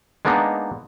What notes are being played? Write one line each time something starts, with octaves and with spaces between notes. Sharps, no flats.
G#3 A#3 B3 D4 D#4